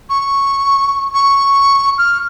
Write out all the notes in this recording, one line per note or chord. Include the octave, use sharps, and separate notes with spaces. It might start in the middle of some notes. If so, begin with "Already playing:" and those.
C#6
C#6
F6